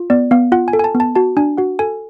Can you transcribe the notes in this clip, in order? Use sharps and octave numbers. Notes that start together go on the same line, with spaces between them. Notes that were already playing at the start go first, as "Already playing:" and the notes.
Already playing: F4
B3 D5
B3 F5
F4 F#5
G#5
A4
G#5
A5
B3
A5
F#4 A5
D4 G#5
F#4 F#5
A4 G#5